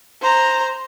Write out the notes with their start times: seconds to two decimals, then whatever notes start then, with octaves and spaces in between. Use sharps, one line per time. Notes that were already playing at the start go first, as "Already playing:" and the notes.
0.22 C5 A#5